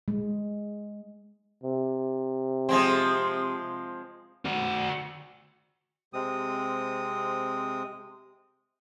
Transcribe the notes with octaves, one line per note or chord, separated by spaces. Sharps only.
G#3
C3
F3 G#3 C4
F#4 D5
C3 G#3 C4 D#6